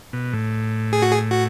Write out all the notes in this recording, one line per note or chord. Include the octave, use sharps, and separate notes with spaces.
B2
A2
G#4
F#4
G#4
F#4